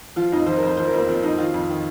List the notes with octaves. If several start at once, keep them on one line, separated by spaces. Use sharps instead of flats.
F3 F4
F2 D#4
F3 C5
A#4
F2 C5
F3 C5
A#4
F2 A#3
F3 C4
F2 D#4
D#3 F4
F2
D#3